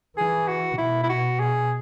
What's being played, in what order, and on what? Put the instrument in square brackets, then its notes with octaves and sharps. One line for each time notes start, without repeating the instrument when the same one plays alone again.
[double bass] E3 [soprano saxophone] G#4
[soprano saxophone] F#4
[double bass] B2 [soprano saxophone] E4
[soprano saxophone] E4
F#4
G#4